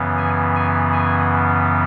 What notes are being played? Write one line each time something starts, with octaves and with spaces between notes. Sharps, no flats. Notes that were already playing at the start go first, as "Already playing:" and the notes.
Already playing: F#2 C#3 E3 B3
G#5
G#5
G#5